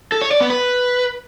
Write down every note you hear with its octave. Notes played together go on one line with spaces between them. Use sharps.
A4
C#5
D5
B3
B4